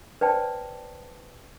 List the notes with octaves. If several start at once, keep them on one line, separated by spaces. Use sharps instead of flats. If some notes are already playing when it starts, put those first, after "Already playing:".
B4 C5 D5 G5 A5